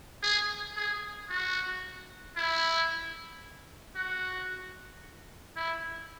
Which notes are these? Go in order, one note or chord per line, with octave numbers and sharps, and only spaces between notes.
G#4
G#4
F#4
E4
F#4
E4